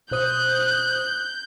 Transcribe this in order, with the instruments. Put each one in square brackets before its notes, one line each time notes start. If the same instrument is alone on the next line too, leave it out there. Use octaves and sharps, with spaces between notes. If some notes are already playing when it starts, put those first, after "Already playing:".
[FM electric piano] B2 C5 D#6 [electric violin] F#6 [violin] G6